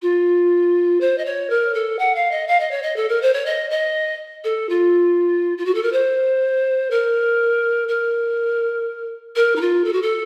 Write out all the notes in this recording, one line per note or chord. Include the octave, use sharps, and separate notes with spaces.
F4
C5
D#5
C#5
A#4
A4
F#5
F5
D#5
F5
D#5
C#5
D#5
A4
A#4
C5
C#5
D#5
D#5
A4
F4
F4
F#4
A4
A#4
C5
A#4
A#4
A#4
D#4
F4
A4
F#4
A4